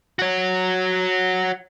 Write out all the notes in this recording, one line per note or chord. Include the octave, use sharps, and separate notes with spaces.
F#4 C#5